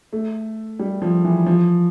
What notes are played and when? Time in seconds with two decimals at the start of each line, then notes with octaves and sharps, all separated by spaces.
0.13 A3
0.79 G3
1.02 F3
1.24 E3
1.46 F3